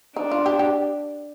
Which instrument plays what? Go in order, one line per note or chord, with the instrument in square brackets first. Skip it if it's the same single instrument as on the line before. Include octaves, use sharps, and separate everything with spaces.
[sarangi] D4 [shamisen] D#4
[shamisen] F4
G4
G4